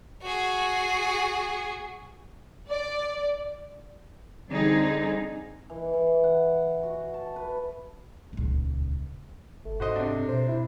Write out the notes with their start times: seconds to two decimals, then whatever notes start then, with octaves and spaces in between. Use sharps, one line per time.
0.22 F#4 G#4
2.70 D5
4.52 D3 G3 C4 D#4 G#4
5.70 E3
5.93 E3
6.24 F#5
6.83 F#4
7.14 A5
7.36 B4
8.33 D#1 C#2
9.65 F#1 A3
9.80 G#2 F#4 C5 D#5
9.96 C3 D4
10.29 B2 C5
10.48 E4